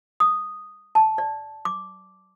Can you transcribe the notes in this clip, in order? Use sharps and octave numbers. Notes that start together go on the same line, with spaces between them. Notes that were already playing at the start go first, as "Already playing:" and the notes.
D#6
A5
D5
D6